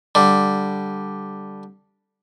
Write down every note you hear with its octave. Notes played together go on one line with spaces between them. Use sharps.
D3 G3